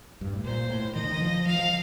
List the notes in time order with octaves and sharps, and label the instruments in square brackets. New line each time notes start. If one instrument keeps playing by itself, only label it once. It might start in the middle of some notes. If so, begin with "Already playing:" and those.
[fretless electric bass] G2
A2
[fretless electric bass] A#2 [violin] C5
[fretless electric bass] A2
[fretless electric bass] D#3 [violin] D#5
[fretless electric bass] D3
D#3
F3
[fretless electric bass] F3 [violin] F5
[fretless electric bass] F3